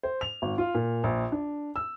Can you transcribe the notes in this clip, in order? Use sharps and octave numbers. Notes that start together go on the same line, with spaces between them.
C5
F7
G#1
F4
A#2
A#1
D4
E6